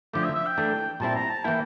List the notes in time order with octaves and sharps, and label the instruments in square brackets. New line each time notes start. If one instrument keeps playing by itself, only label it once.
[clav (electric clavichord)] D3 F3 A3 [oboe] G4
[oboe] E5
E5
G5
[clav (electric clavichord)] E3 A3 D4
[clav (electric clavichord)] A#2 G3 C4 E4 [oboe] A5
[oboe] A#5
A5
[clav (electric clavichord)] E3 A#3 E4 [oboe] G5